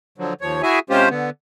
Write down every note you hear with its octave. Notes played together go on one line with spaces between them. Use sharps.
D3 F3 F#3
D#2 F3 C#5
E4 F#4 G#4 E5 G#5
C3 G#3 C#4 F4 G4 C5
D3 B3